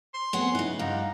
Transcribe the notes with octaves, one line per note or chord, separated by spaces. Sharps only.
C6
A3 B3 C4 G#4 C#5 F#5
C#3 D#4 E4 B4
G2 D#4 F5 F#5